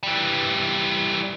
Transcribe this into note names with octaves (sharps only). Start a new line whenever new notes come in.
E3 G3